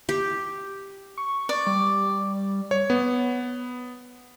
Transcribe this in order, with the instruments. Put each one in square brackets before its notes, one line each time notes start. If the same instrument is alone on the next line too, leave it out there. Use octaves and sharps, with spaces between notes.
[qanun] G4
[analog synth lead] C#6
[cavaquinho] D5
[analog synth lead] G3
[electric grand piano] C#5
B3